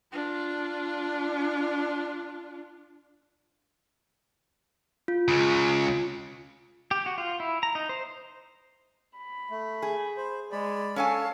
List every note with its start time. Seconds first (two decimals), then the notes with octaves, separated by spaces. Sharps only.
0.12 D4 F4
5.08 F4
5.28 C#2 C#3
6.91 G4
7.06 F#4
7.18 F4
7.40 E4
7.63 A#5
7.75 D#4
7.89 C5
9.17 B5
9.50 A3
9.82 G#4
10.17 C5
10.52 G#3 D5 B5
10.96 C#4 A4 C#5 F5 G#5 A5